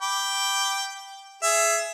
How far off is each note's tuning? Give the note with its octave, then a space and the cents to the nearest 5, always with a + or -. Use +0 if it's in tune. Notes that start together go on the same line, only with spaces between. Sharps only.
G5 +0 B5 +0 D6 +0
G#4 +20 E5 +15